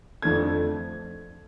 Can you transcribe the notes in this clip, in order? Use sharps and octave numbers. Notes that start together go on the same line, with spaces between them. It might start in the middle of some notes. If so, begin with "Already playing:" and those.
F2 D3 F3 A3 G#6